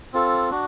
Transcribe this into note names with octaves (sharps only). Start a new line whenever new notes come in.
C4 F4 A4
D4 F#4